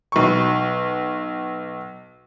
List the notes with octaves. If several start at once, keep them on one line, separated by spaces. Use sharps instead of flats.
B1 C#6